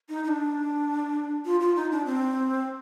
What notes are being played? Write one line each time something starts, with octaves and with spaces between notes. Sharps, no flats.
D#4
D#4
D4
F4
F4
D#4
D4
C4